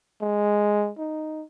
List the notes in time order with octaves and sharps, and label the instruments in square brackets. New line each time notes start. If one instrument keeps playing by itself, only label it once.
[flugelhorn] G#3
D#4